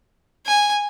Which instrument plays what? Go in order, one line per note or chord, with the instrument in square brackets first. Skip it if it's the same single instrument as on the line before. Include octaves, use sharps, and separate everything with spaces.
[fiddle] G#5